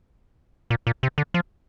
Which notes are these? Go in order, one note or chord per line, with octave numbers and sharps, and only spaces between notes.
A#2
A#2
C3
D3
F3